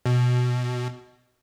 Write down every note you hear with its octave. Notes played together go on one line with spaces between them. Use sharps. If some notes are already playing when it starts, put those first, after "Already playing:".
B2